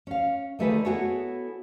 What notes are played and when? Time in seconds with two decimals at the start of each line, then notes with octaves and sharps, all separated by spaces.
0.07 C#4 F5
0.59 D3 D#3 A3 D#4 G#4 B4
0.85 B3 E4 F#4 G#4 A4 C#5